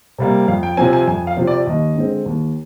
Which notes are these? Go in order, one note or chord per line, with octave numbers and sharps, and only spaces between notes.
C3 G3 A#3
F2 F5
G5
C3 F3 C4 G#5
G#5
F2 G#5
F5
C3 F3 C4
D5
D#2 D#5
D3 G#3 C4
D#2